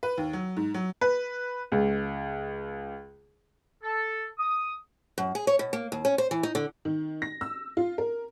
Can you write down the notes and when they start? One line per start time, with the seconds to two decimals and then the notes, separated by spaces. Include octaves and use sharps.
0.03 B4
0.18 D#2
0.33 F#3
0.57 G#2
0.74 F#3
1.01 B4
1.72 C#2
3.84 A4
4.39 D#6
5.18 F#2
5.35 G#4
5.47 C#5
5.59 B2
5.73 A#3
5.92 D#2
6.05 C#4
6.18 C5
6.31 E3
6.43 D#4
6.55 D3
6.85 D#3
7.22 A#6
7.41 E6
7.77 F4
7.98 A#4